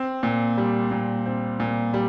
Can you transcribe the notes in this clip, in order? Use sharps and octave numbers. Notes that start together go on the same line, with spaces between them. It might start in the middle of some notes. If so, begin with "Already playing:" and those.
Already playing: C4
A#2
G3
A#2
C4
A#2
G3